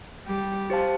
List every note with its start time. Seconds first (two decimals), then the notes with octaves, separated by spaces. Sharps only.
0.26 G3 G4
0.70 G4 C5 F5 A5